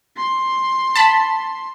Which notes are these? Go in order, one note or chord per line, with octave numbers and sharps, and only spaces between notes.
C6
A5 B5